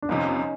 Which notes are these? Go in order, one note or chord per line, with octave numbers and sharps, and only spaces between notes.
D4
G1 F2 C3 C#4 D#4